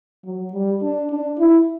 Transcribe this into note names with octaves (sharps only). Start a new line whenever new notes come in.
F#3
G3
D4
D4
E4